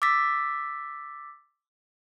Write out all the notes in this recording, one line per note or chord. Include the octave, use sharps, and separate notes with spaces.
D6 E6 A6 B6